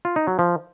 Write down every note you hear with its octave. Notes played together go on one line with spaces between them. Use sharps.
F4
D#4
F#3
F3